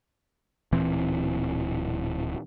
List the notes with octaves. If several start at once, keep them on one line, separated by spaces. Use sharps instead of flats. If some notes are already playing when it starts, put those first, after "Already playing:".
D1 A#2 E3 C4